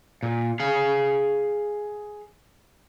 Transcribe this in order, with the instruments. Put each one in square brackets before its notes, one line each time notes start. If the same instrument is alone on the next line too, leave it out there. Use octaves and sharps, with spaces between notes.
[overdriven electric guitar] A#2
G#4 F5